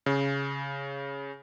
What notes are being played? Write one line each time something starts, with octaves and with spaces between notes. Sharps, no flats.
C#3